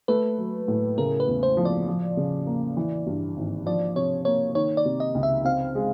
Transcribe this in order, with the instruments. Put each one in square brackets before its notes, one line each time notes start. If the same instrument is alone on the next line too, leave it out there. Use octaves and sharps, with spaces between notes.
[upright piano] A3 [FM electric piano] B4
[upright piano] F#3
A2
[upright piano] C#3 [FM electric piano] A#4
[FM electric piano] B4
[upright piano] E2
[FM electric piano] C5
[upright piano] F3
[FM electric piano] D5
[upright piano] F3
C#3
A#3
E3
G2
G#1
[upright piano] F3 [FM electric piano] D5
[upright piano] C3 [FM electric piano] C#5
[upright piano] A#3 [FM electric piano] C#5
[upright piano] D#3 [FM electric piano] C#5
[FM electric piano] D5
[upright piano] C3
[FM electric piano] D#5
[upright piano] C#2
[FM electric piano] E5
[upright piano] C4 [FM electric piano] F5
[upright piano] G#3